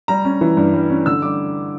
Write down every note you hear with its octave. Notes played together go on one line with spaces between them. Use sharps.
G3 A#5
C#4
E3
G2
G3
C#4
D3 E6
G3 D6